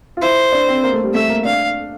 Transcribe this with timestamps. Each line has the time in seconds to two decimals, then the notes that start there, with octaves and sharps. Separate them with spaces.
0.17 F4
0.21 E4 C5
0.52 D4
0.68 C4
0.83 A#3
0.93 A3
1.04 G3
1.13 A3 E5
1.29 A#3
1.45 D4 F5